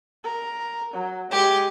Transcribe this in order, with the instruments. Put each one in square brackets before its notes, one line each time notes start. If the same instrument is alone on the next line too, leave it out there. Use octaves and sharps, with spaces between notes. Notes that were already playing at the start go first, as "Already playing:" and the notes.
[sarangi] A#4
F#3
[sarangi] G#3 [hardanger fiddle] G4